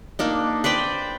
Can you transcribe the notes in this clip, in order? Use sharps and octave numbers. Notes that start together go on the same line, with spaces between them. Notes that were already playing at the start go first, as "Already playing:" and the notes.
A#3 D4 D#4
B4 C5 D5 G5